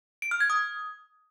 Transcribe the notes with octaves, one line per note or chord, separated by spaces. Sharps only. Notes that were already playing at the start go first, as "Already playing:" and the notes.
D7
F6
G#6
D#6